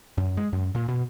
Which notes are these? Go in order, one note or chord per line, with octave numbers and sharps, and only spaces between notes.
F#2
G#3
F#2
A#2
B2